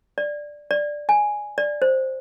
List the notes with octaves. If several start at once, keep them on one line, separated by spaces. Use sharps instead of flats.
D5
D5
G#5
D5
C5